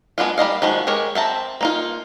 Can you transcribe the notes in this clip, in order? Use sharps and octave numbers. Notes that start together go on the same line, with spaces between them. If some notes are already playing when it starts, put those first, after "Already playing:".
G#3 B3 D4 F4
G3 A#3 D#5 F5
D#3 F3 G#3 F#4
G#3 G4 A#4 C#5
C4 E5 A5 A#5
A#3 D#4 F4